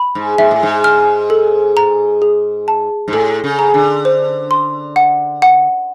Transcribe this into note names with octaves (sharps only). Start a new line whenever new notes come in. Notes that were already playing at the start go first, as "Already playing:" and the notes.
Already playing: B5
G#2
G#2 E5
A2
G#2
F6
A4
A#5
G#4
A5
G#2
A2 A4
C#3
A#5
D3
C5
C6
F#5
F#5